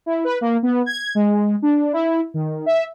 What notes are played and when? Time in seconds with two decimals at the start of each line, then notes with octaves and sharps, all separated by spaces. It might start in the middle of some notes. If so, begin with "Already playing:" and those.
0.06 E4
0.24 B4
0.41 A#3
0.63 B3
0.86 G#6
1.15 G#3
1.62 D4
1.93 E4
2.34 D#3
2.66 E5